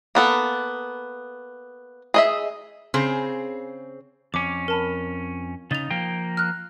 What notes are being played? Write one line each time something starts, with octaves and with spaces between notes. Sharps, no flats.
A#3 B3 A4
G#4 D#5 E5
C#3 C4 G#4
F2 C#4 D6
A#4 A5 B5
C#3 D#4 A6 F7
F3 A#3 G5
F6 F#6